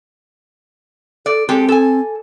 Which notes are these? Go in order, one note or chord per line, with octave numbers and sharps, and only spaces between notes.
A4 D5
G#3 C4 G4 A4
A4 G#5